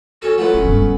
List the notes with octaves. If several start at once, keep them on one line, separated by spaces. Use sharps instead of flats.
C#4 F#4 A4
F#3 A3 B3 F4
D#1 C#4
G1